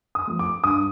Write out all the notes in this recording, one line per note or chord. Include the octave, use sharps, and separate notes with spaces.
D#6
F3 A3
D6
G2 D#6